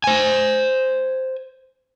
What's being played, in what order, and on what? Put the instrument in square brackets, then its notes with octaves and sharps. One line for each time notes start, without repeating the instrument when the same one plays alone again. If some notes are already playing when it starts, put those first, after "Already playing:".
[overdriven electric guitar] C5 G#5